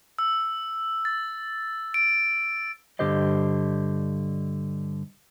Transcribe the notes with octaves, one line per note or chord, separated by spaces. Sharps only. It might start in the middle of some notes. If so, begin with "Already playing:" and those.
E6
A6
D7
G2 D3 G4 C5 D#5